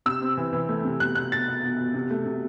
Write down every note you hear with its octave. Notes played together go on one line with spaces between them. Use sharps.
C3 E6
C4
E3
E3
A3
C3
B2 F#6
B2 F#6
B2 A6
B2
B2
B2
C3
A3
C3